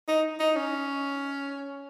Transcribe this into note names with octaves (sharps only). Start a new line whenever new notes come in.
D#4
D#4
C#4